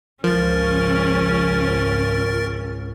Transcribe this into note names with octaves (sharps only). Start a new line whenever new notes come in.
G#1 C#2 F3 C#4 A#4 A6